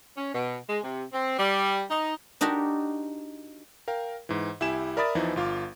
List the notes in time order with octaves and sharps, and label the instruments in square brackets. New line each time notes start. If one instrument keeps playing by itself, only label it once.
[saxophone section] C#4
B2
G#3
C3
C4
G3
D#4
[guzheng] D4 D#4 F#4 G4 A#4
[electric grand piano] A#4 F5 G5
G#2 E3
C2 E4 G4 G#5 E7
A#4 D5 E5 B5 D#6 A6
E2 E3 F3 D#4 E4
G1 F4 F5 D6